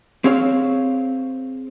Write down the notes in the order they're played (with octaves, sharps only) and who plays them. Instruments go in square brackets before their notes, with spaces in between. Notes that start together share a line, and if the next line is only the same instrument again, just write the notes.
[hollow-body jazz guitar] C4 G#4 C#5 F5